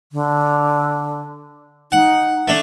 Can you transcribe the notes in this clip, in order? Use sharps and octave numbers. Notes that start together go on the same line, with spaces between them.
D3
D#4 F#5
A3 D4